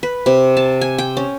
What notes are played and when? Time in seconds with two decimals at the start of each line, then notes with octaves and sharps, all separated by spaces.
0.03 B4
0.26 C3
0.57 A5
0.81 G#5
0.98 G5
1.17 C#4